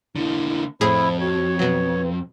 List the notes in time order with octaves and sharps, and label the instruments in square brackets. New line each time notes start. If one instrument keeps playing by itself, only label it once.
[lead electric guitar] D3 A#3 [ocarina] E4
[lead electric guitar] F2 [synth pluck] A2 G#4 [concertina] E4 [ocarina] C5
[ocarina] F#4 [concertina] C#5
[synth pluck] B2 F#3 [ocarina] B4